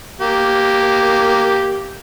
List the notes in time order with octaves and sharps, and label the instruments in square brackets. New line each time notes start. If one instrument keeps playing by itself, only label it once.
[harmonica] A#3 G4